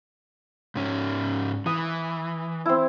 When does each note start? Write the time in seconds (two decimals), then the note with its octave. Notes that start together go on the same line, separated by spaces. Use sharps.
0.75 G#2 C#4
1.66 E3 D#6
2.66 C4 E4